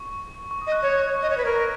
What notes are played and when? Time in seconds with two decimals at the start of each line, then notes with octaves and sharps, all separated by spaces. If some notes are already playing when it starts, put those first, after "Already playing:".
Already playing: C#6
0.51 C#6
0.62 D#6
0.67 D#5
0.72 F#6
0.83 C#5
1.22 D#5
1.30 C#5
1.38 B4
1.45 A#4 G#6
1.56 A#6